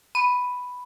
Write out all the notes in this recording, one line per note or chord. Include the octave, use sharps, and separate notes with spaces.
B5 D#7